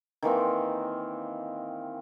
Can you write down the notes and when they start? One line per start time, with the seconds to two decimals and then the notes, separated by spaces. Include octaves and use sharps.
0.23 D#3 E3 A#3 C4